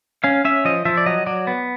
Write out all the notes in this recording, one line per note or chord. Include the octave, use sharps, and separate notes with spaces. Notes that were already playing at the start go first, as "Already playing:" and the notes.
C#4 F5
C#4 E5
F3 D#5
F3 E5
D5
F#3 D#5
F#3 D5
B3